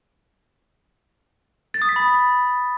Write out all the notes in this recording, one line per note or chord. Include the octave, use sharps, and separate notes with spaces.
A6
D#6
B6
B5